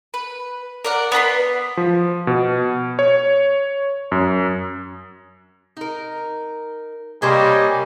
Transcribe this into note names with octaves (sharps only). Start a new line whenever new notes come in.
B4
A#4 D5 F#5
B3 B4 A#5 C6
F3
B2
C#5
F#2
D#4 A#4
C3 G3 A#3 C5 C#5 D#5 G#5